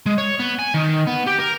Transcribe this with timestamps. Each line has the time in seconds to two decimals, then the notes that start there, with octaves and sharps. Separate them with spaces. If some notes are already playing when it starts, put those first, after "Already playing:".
0.06 G#3
0.18 C#5
0.39 B3
0.59 G#5
0.74 D#3
1.07 B3
1.27 G4
1.40 A#4